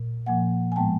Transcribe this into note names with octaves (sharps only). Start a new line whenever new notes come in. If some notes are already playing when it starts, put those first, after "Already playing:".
Already playing: A#2
A#2 F3 A#3 F#5 G#5
G#5
A2 F3 G#3 B3 G5 A5